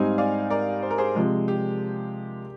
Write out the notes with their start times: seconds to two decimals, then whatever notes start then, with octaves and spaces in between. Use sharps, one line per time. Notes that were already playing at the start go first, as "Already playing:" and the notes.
Already playing: G#2 G3 C4 D#4 F5 G#5
0.18 D5 F5
0.50 A#4 D5
0.83 C5
0.91 A#4
0.98 G#4 C5
1.15 C3 F3 G#3
1.48 G4